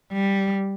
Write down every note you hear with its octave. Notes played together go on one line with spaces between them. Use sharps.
G3